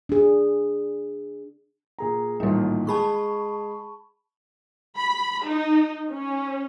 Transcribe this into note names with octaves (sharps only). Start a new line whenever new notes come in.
D4 G#4
A#2 G#4 A#5
A1 A#2 D#3 G3 A#3
G#3 G#4 A5 B5 C#6
B5
D#4
C#4